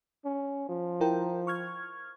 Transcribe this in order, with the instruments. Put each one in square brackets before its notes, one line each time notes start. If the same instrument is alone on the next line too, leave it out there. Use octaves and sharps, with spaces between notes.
[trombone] C#4
F3
[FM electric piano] E4 A#4 G5
C#6 F6 G#6